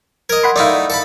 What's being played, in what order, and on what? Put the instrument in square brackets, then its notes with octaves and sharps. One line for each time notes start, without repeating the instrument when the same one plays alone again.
[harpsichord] A#4 D#5 [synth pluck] G#6
[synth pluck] F#5 B5 C6
[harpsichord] A3 D#4 E4 [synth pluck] D5 F5
[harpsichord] A4 A5 B5